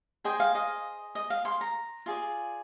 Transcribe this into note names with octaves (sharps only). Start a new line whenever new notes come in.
G#4 C5 D#5 G5
F5
D#5
D#5
F5
C6
A#5
F4 G#4 D5